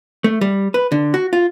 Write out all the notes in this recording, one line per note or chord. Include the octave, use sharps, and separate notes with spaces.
A3
G3
B4
D3
F#4
F4